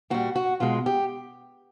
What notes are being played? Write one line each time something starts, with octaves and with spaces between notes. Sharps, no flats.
A#2 G3 F#4
F#4
B2 G#3 F4
G4